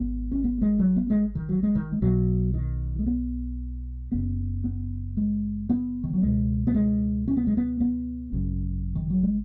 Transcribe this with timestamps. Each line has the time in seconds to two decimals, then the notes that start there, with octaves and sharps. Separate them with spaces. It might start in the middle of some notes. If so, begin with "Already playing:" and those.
Already playing: G#1 G#2 B3
0.31 C#4
0.44 B3
0.61 G#3
0.79 F#3
0.96 B3
1.10 G#3
1.35 D#3
1.49 F#3
1.63 G#3
1.75 D#3
1.92 G#3
2.01 B1 B2 F#3
2.54 D#3
2.99 G#3
3.07 B3
4.12 F#1 F#2 C#3 B3
4.64 B3
5.17 G#3
5.69 B3
6.04 D#3
6.13 F#3
6.22 C#2 B2 G#3
6.67 B3
6.75 G#3
7.28 C#4
7.37 B3
7.47 G#3
7.57 B3
7.80 B3
8.32 G#1 F#2 C#3
8.95 D#3
9.10 F#3
9.23 G#3